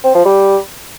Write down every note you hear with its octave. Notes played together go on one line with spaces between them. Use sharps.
C4
F3
G3